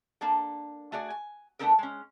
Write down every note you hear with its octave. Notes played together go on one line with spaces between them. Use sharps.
A#3 D4 A4
A3 F#4 G#4 D5
G#5
A3 B3 D4 D#4 A4 A#4
G#3 C#4